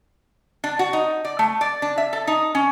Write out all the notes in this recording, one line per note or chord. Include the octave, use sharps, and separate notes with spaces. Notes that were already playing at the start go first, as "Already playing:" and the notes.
D4
F#4
D#4
D5
A3
D5
D4
E5
A4
D#4
C#4